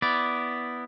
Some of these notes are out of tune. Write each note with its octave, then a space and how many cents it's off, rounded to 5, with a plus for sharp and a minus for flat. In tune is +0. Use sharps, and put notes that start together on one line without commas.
B3 +0 E4 +0 D5 -10